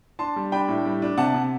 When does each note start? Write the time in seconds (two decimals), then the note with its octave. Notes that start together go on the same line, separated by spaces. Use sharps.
0.19 D4 A5 C6
0.36 G3
0.52 D4 G5 B5
0.68 A2
0.86 G3
1.02 D4
1.18 C3 F#5 A5
1.34 C3